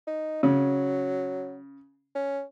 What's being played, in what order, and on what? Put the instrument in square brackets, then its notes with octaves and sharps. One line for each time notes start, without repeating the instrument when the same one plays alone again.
[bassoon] D#4
[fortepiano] C#3 [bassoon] F#3
[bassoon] C#4